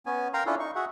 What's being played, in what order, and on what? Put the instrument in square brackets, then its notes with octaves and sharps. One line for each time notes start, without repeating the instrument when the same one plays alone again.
[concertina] B3 C#4 G#5
A#4 F5 G5 A#5 C6
C#4 D4 E4 F4 A4
D#4 C#6
F#4 G#4 E5 F#5